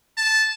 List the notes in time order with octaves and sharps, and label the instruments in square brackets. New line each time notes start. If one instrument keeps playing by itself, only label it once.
[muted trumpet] A5